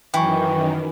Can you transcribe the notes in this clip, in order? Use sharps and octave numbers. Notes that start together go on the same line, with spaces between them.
F#2 D#3 E3 G5 C#6